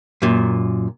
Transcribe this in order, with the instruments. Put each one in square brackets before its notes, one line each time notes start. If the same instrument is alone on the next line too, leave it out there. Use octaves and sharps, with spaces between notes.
[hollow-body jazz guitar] F#2 A#2